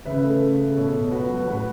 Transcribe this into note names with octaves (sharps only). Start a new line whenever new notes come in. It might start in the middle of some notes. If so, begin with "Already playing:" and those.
C#3 B4 E5
A3
C#3
A3
B2 A4 C#5
B2
B3 F#4 B4
F#3
A2 F#4 B4